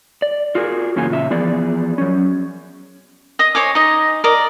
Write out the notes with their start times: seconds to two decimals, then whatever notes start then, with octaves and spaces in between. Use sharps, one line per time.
0.22 D5
0.55 F4 F#4 G#4 A#4
0.96 F#2 C#3 E3 A#3 F4 G#5
1.10 A#2 C#3 E5
1.30 E3 F3 B3 G#4 D5
1.98 F#3 C#4
3.39 D#5 D#6
3.55 C5 C#5 G#5 D6
3.75 D#4 D#5
4.24 A#4 D5 D#5